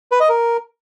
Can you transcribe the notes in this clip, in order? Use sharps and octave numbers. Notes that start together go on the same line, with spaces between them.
B4
D#5
A#4